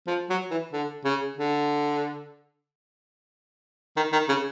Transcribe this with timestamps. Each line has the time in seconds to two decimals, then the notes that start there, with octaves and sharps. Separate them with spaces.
0.07 F3
0.30 F#3
0.51 E3
0.73 D3
1.05 C#3
1.37 D3
3.97 D#3
4.13 D#3
4.29 C#3